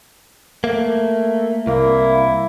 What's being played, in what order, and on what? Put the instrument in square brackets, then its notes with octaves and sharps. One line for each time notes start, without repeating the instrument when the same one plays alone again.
[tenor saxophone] A3 [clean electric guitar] A#3
[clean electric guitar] C2 [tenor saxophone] A#3 [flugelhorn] E4